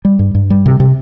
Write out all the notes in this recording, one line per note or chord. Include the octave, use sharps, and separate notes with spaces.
G3
G2
G2
G3
C3
C3